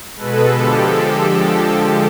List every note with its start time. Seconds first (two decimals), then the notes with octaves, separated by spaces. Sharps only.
0.16 B2 G#3 A4 B4
0.53 D3 F3 G#3 G4 A4